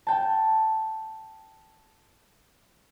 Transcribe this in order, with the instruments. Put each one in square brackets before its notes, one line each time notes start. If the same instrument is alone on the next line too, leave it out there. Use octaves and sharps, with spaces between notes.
[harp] G5 A5